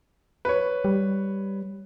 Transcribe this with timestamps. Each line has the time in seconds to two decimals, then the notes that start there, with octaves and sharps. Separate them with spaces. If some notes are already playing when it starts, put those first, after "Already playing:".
0.45 B4 C#5
0.85 G3